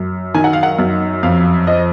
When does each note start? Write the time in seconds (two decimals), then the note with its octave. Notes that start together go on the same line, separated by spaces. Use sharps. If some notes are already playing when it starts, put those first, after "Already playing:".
Already playing: F#2
0.34 D#3 G#5
0.44 F#5
0.53 F5
0.63 F#5
0.79 F#2
1.23 F2 F5
1.67 F3 D#5